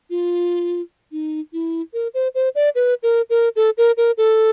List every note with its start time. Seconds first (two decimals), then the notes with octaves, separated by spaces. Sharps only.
0.10 F4
1.12 D#4
1.53 E4
1.94 A#4
2.14 C5
2.35 C5
2.55 D5
2.75 B4
3.03 A#4
3.30 A#4
3.56 A4
3.78 A#4
3.97 A#4
4.18 A4